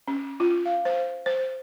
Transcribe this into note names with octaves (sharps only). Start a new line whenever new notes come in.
C#4
F4
F5
C5
C5